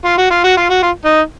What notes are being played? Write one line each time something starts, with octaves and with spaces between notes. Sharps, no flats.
F4
F#4
F4
F#4
F4
F#4
F4
D#4